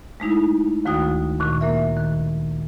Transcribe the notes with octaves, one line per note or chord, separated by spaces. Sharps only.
G#3 A3 D#4 E4
D2 D#3 A3 F#4 G5 D#6
A#2 D#3 C#6
A#3 A#4 E5
D#3